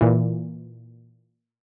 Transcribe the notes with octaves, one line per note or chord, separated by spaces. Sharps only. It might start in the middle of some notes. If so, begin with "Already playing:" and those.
A#2 E3